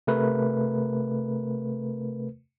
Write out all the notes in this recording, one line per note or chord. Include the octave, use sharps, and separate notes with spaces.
C3 A3 A#4 B4